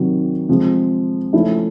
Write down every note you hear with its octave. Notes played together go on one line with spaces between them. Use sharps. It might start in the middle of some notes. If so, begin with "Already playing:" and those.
Already playing: C3 D#3 F#3
C3 F3 G#3
F3 A3 C#4 E4